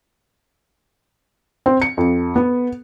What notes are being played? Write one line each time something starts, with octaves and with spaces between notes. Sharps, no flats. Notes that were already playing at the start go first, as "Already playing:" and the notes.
C4
C#7
F2
B3